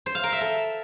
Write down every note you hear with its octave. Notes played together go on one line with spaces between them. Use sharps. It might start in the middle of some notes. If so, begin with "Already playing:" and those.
C5
F5
A#4
E5
A4